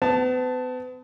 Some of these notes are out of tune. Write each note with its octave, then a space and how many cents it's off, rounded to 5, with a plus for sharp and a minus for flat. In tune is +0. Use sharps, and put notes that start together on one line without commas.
B3 +40 A5 +0